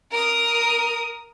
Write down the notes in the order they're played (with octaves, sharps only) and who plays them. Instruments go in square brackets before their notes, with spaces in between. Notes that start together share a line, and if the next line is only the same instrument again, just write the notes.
[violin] A#4 D#6